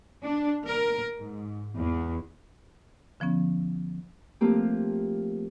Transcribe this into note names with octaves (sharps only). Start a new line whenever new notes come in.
D4
A#4
G#2
E2
D3 F3 B3 C#4
F3 A3 A#3 C4 G4